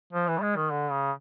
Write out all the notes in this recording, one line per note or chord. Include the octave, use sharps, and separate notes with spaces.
F3
E3
G3
G#3
D#3
D3
C#3